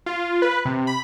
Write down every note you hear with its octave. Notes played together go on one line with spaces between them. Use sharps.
F4
B4
C3
B5